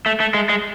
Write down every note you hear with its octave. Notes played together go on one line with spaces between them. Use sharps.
A3
A3
G#3
G#3